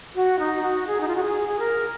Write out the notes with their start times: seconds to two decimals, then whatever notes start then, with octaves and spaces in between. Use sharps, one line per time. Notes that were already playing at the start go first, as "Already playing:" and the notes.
0.15 F#4
0.39 D#4
0.63 F#4
0.87 G#4
1.01 D#4
1.08 F4
1.16 F#4
1.23 G#4
1.48 G#4
1.59 A#4